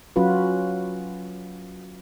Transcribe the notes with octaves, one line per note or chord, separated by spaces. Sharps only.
F#3 C#4 F4 F#4 B4